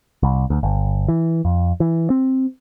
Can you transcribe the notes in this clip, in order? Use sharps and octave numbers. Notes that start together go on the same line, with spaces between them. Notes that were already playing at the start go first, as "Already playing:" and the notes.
C2
D2
G1
E3
F2
E3
C4